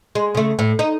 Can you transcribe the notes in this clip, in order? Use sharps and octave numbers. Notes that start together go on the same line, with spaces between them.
G#3
C#3 A3
A2
D#4